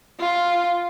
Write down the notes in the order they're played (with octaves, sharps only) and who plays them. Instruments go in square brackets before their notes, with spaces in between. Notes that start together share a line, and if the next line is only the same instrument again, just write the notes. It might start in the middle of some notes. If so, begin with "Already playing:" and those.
[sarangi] F4